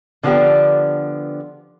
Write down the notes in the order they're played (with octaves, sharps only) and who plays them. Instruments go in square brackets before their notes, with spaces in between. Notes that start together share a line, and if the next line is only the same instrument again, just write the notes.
[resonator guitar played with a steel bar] D3 F3 B3 D4 G4